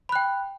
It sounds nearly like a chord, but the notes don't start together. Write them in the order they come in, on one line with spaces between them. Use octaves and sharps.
B5 F#6 G5